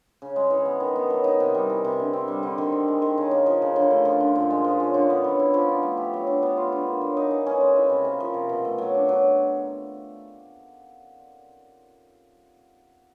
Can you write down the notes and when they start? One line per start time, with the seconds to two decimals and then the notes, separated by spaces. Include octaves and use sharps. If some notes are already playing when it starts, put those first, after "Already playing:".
0.22 C#3
0.36 G#3
0.50 E3
0.65 B3
0.80 D#3
0.96 B3
1.10 F#3
1.24 D#4
1.40 C3
1.54 G3
1.70 E3
1.84 C3
1.99 D3
2.13 C4
2.28 G3
2.43 D3
2.58 D#3
2.72 C4
2.88 G#3
3.02 D#3
3.18 C#3
3.31 A#3
3.46 F3
3.62 C#3
3.76 D3
3.90 A3
4.05 F3
4.20 D3
4.35 A#2
4.50 G#3
4.64 F3
4.80 C#4
4.94 D3
5.10 B3
5.24 F#3
5.39 E4
5.54 F3
5.69 D4
5.83 A3
5.97 G4
6.13 F#3
6.27 D4
6.43 B3
6.57 F4
6.72 D3
6.87 A#3
7.01 F#3
7.17 D#4
7.30 E3
7.46 C#4
7.61 G#3
7.76 E4
7.90 C3
8.04 A#3
8.20 F3
8.34 C3
8.49 B2
8.65 A3
8.78 F#3
8.94 D4
9.09 F#3